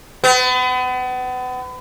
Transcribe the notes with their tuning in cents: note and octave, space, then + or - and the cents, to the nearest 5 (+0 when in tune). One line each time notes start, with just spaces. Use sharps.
B3 +35